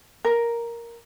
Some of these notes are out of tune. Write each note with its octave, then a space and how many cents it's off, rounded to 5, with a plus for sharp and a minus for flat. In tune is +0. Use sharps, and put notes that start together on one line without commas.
A#4 +5